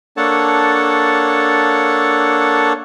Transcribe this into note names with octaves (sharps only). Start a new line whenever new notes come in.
A#3 D4 A4 C#5 F#5 A5